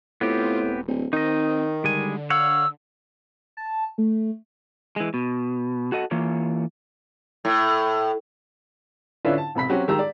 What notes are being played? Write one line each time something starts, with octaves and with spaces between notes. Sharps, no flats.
A2 B3 C4 F4 G4
E1
D1
D#3 C4 D#4 D#5
D3 G3 G#3 G#5
C#5 F5 F#5 E6
A5
A3
E3 G#3
B2
F#4 A4 D#5 F#5
E3 A#3 F4 C#5
A2
D3 C#4 D4 E4 F4 B4
A5
E1 C3 B5 B6
F#3 C4 C#4 F#4 G4
D#3 G#3 G4 A#5 E6
D5